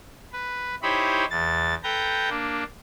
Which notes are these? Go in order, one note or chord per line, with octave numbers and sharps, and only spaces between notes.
B4
D#4 E4 G4 C5 C#5 B5
E2 A6
A4 B4 G5 A#5 G6
A#3 D4